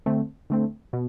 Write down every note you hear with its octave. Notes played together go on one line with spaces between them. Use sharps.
D3 A3 C4
D3 A3 C4
B2